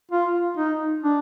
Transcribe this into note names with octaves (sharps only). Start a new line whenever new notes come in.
F4
D#4
D4